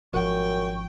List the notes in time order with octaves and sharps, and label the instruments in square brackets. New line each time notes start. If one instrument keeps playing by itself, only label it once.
[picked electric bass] G#1 F3 [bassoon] F#2 [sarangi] G5 [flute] C#6